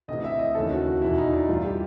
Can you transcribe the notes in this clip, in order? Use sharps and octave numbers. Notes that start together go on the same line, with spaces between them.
D2 C3 E3 D#5
E5
D#5
D#2 C#3 E3 A4
F#4
F#4
E2 B2 E4
D#4
D4
G2 E3 F4
G4